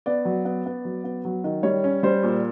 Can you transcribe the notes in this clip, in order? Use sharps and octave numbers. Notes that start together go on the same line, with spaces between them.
B3 D5
F#3
B3
B3
F#3
B3
F#3
D#3
G3 C#5
C#4
G3 C5
A#2